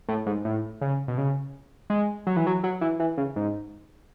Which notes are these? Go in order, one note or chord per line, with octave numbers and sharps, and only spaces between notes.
A2
G#2
A2
C#3
B2
C#3
G#3
F#3
E3
F#3
F#3
E3
E3
C#3
G#2